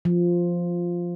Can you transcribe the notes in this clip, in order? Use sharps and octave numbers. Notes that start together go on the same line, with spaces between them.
F3